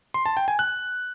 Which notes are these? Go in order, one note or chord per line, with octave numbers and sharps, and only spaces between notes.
C6
A5
G5
G#5
F#6